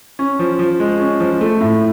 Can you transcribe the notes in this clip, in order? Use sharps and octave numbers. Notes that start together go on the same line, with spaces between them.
C#4
F3
F3
G#3
C#4
F3
A3
A2